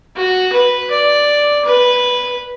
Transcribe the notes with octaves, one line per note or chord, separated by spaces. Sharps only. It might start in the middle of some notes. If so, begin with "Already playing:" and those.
F#4
B4
D5
B4